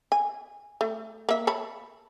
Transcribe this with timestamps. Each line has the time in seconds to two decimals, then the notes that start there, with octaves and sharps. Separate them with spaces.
0.12 G#5
0.81 A3
1.29 A#3 E5
1.47 C#5 A5 B5